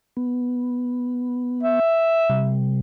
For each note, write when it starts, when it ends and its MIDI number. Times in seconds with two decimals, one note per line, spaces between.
0.17 1.80 59
1.63 2.54 76
2.30 2.80 48
2.30 2.80 55